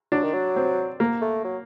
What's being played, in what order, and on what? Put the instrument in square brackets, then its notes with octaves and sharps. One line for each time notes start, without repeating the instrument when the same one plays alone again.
[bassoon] F#3 [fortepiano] D4
[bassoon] D#3
F#3
[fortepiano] C4
A#3
[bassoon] A3
F#3